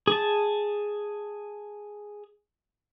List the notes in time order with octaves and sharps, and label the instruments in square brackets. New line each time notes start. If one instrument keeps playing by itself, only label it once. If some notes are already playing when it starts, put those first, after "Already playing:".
[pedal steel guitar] G#4 A5